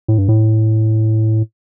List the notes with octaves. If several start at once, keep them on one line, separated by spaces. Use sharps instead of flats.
A2
G2
A2